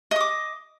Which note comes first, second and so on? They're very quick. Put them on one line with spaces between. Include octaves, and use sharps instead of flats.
D#5 D#6 D6